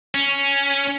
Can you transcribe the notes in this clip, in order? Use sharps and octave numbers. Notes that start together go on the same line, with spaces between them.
C#4